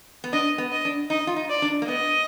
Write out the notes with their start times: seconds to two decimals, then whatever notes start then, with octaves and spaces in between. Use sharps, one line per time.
0.24 B3
0.33 D4 D#5
0.58 B3
0.72 D#5
0.85 D4
1.10 D#4 D#5
1.27 F4
1.36 D#4
1.50 D5
1.62 D4
1.82 A#3
1.88 B3 D#5